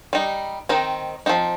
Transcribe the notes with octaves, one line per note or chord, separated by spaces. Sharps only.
G3 D#4
D#3 C4 D#4
F3 C4 D#4